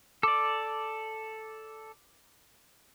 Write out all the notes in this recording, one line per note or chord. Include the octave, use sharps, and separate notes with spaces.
A4 D5 D6